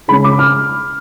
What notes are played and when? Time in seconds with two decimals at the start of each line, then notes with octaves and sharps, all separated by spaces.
0.08 C#3 G#3 C#4 B5
0.24 D6
0.39 F6